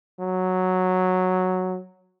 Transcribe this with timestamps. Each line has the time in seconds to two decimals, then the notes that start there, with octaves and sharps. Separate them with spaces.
0.20 F#3